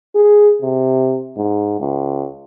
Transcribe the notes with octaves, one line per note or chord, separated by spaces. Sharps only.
G#4
C3
G#2
C#2